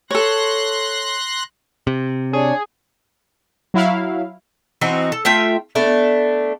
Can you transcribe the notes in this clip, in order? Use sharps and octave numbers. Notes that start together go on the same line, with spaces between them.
A4 C#5 C6 F#6 A#6
C3
D4 G#4 C#5
F#3 E4 F5
E3 C4 D#4 F#4
A4
A3 F4 E5 G5
A3 B3 D4